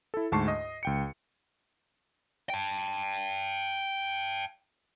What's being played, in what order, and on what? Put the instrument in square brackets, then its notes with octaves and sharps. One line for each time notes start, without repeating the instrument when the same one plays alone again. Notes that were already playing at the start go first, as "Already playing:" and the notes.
[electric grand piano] E4 A4
D2 G#2 A5 C#6 C7
D#5
C#2 G5 C#7
[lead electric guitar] G5 A5